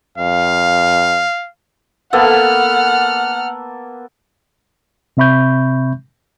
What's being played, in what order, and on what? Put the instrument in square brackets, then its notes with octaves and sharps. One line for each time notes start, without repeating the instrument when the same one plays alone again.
[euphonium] F2 [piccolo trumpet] F5
[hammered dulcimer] A#3 B3 A4 [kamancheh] F#5 F6
[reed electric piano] C3 C4 E5 B5 C#6 G6